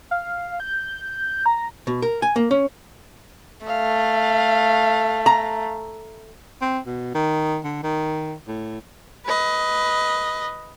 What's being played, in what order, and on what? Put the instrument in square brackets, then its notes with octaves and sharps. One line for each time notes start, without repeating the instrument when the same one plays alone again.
[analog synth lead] F5
G6
A#5
[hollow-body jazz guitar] B2
A#4
G#5
A#3
C#4
[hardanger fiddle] A3 [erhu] F5
[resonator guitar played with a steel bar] A#5
[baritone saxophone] C4
B2
D#3
D3
D#3
A2
[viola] B4 D#5